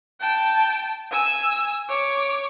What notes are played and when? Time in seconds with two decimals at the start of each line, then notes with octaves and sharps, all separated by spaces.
0.20 G5 A5
1.11 G#5 E6
1.89 C#5 D6